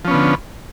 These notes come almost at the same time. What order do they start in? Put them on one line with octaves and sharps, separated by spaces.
F3 C#4 B3 D3